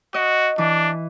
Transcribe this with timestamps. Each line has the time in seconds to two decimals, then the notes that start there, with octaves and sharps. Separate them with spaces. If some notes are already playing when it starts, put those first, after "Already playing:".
0.14 F#4 D#5
0.58 E3 D4